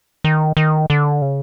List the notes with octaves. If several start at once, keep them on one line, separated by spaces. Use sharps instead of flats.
D#3
D#3
D3
C#3